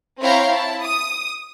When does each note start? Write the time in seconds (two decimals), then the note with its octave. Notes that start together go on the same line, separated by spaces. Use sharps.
0.21 C4 E4 C#5 F5 G5 A#5
0.51 E4 A5
0.84 D#6